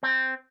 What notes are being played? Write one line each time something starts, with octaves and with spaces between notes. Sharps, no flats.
C4